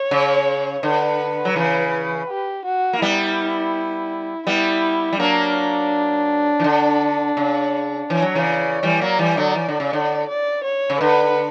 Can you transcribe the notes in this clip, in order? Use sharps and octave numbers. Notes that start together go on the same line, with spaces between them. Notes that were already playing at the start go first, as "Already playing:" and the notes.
Already playing: C#5
C#3
D3 B4
F#3
C#3 E3
G4
F#4
A#3
G3 B3 E4
G3 B3 E4
G3
F#3 A#3 D4
E3
D3
C#3
E3 C#5
F#3
C#3 E3
D5
E3 G3
F#3 A#3
E3 G3
D3 F#3
E3
D3
C#3
D3
D5
C#5
C#3
D3 B4